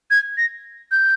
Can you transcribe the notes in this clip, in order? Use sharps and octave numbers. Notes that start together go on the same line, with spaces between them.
G#6
A#6
G6